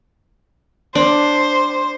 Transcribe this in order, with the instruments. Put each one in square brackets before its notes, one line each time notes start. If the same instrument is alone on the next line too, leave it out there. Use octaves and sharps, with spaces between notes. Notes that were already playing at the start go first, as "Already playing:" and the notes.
[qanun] D4 D5 [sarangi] C5